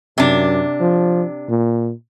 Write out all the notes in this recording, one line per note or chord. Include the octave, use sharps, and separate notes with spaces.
F#2 C3 D4
F3
A#2